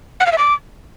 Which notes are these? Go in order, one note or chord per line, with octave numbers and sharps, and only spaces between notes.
F#5
F5
E5
D6